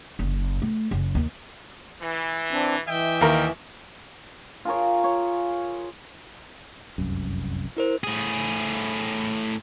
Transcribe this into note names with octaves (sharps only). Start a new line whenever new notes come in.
F#1
A3
F#1
D#2
E3
C4 D4
E3 D#5 E5 G5
D#2 A#4
F4 G#4 A#4 C#5
C#5
F1 C2 F#2
E4 A#4 C5
A2 G#4